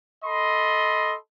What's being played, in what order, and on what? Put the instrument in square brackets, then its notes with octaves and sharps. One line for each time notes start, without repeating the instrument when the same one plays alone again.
[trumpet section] A4 D#5 B5 C6